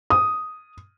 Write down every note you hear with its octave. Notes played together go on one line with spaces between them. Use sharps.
D#6